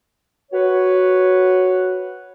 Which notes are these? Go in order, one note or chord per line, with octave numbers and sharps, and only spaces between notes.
F#4 B4 C#5